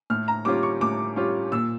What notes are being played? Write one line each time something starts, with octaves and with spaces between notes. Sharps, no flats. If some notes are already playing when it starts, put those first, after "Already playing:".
A2 F6
A#5
G3 C#4 F4 D6
C#6
A2 D6
G3 C#4 F4
A#2 E6